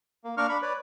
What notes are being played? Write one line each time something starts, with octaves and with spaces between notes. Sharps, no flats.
A#3
A#3 D4 A#4 C#6 F6
D4 B5 C#6
B4 C#5 D5